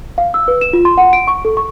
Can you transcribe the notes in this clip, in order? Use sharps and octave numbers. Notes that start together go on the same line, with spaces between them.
F5
E6
B4
E7
F4
C6
F#5
D7
C#6
A4
C#6